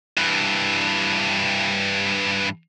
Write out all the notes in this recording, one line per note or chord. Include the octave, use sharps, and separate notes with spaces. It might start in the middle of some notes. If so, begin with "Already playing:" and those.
G2 E3